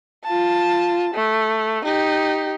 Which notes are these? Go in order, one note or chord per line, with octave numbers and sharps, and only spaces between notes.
F4 A5
A3
D#4 G4